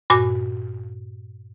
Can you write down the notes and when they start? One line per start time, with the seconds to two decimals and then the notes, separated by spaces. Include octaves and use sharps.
0.10 G2 A#2 F#4 G#5 D6